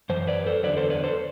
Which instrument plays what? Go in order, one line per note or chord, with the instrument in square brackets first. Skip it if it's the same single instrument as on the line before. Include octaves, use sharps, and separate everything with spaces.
[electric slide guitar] F#2 E3 C5
B4 D5
A4 C5
E2 D3 F#3 B4 D5
A4 C5
B4 D5
A4 C5